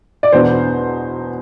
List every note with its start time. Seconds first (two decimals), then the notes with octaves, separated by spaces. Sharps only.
0.23 D5
0.32 E2 B2 B3 D4 C5